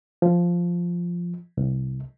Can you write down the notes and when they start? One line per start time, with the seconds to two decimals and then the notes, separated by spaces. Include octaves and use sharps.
0.22 F3
1.57 C2